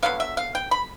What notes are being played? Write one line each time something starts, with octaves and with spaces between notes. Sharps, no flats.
D3 F#3 B3 F5
E5
F5
G5
B5